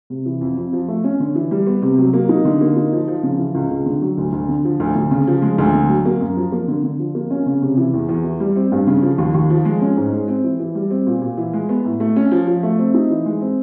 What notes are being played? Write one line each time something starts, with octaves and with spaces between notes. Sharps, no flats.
C3
E3
F2
F2
F3
A3
C#4
D3
E3
G3
B3
C3
F#3
A#3
D#4
D3
A#3
D#4
F3
F3
C#3
E3
C#2
C#2
D3
F#3
D2
D2
D3
F3
D2
D2
C#3
F3
G#3
D2
D3
F#3
A#3
F#2
F3
A#3
D3
D3
F3
A#3
C#4
C#3
C3
E3
E2
E2
E3
G3
C4
G2
C#3
F3
D#2
D#2
F3
G#3
C#4
G#2
G#3
C4
E3
E3
G3
C4
A#2
A#2
E3
G#3
B3
A2
A3
C#4
F3
F3
A3
C4
D#4
E3
G#3
C4